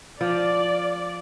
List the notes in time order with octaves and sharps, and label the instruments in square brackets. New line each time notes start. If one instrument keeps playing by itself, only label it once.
[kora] F3 [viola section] D5